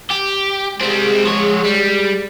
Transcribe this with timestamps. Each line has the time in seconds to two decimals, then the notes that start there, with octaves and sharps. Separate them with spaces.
0.10 G4
0.81 G3 G#3 C4
1.26 F3 C#5
1.65 G3